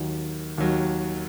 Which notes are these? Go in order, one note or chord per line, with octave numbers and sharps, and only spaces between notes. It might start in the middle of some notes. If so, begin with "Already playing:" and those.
Already playing: D#2 D#3 F#3
D#2 D#3 F#3